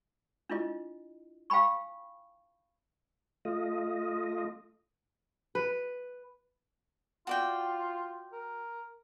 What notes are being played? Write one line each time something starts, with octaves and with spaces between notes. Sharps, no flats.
D4 E4 F4 D#5
F5 G5 G#5 B5 C#6
A3 F4 D#5
B4
F4 F#4 D5 G5
A#4